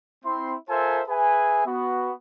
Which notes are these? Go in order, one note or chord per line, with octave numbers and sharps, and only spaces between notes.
C4 E4 C6
F4 A4 A#4 C5 E5 G#5
G#4 B4 E5 G#5
B3 F#4